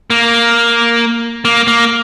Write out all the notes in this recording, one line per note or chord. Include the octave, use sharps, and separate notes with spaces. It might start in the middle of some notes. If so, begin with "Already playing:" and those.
A#3
A#3
A#3